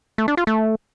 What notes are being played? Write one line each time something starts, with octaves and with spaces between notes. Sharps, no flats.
A3
D4
F4
A3